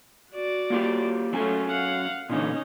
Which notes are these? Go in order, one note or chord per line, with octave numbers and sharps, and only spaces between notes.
F#4 D5
A#3 F4 G4
F#3 A3 C#4 F4 G#5
F5 F#5
A#2 D3 E3 C#4 D#4